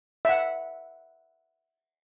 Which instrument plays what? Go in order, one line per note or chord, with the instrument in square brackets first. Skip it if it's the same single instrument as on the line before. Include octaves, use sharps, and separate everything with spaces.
[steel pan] E5 F#5